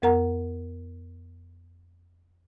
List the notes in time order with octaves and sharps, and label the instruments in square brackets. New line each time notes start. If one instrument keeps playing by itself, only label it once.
[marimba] F2 B3 A#4 F#5 A#5